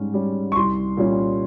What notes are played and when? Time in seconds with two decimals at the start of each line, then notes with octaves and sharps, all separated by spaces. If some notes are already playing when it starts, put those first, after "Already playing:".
Already playing: G#2 G3 C#4
0.14 G3 C#4
0.52 C#6
0.56 C2 C6
0.97 A#2 G3 C#4